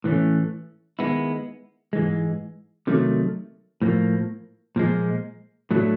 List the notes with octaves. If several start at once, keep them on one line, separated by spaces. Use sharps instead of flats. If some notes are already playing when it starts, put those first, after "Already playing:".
A2 E3 A3 C#4
D#3 G#3 B3 E4
G#2 E3 G#3
C3 D#3 F#3 A3
A2 F3 A#3
A#2 F3 G#3
A2 F#3 A3 D4